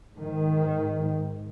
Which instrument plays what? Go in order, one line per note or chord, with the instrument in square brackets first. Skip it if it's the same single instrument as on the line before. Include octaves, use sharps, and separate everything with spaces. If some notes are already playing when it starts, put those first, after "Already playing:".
[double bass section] G#2 D#3